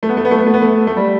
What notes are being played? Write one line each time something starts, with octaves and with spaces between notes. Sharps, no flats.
A3
B3
A3
B3
A3
B3
A3
B3
A3
A3
G3